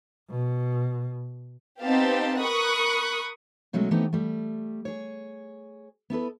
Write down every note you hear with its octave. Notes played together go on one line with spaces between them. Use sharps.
B2
B3 C4 D#4 G4 F5 A5
A#4 B5 C#6 D#6 F#6
B2 F#3 G#3 A3 C#4
E3 A3 B3 C4 D#4 G4
G3 A3
G#4 C#5
B3 E4 A4 B4